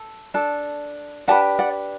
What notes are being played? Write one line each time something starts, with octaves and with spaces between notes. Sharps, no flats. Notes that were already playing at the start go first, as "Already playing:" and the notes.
Already playing: A4
D4 A4
D4 G4 B4 F#5 A5
D5 F#5